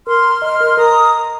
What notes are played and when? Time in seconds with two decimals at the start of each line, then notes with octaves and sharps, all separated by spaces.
0.07 A#4 C6 F6
0.25 A#5
0.42 D#5 C6 F6
0.60 A#4
0.67 C6
0.77 A#4 A#5 D#6